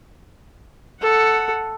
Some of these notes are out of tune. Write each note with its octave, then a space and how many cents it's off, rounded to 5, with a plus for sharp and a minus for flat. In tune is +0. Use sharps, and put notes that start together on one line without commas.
A4 +5 F#5 +0